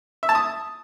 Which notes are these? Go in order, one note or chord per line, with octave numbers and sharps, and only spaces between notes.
E5
A5
D#6